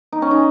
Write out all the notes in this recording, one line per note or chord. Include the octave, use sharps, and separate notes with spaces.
D#4
C#4
D#4